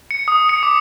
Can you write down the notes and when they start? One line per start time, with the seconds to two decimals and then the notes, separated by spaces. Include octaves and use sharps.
0.11 C#7
0.28 D#6
0.49 C#7
0.63 D6